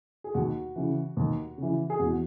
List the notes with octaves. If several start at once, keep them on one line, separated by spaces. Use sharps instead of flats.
G#4
D#2 F#4
C#3 E3
D#2
C#3 E3
G#4
E2 F#4
F#4